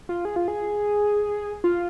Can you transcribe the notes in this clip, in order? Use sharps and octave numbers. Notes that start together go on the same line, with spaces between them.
F4
G#4
F4
G#4
F4